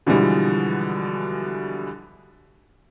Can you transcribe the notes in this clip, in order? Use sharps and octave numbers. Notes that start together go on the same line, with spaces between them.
B2 D3 E3 F3 G3 G#3